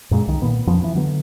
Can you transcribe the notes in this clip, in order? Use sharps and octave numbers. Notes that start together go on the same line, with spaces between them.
F#2 A#2 G#3
C2 D#3
A#2 B3
F2 F3 B3 C#4
E3
D3 F#3 B3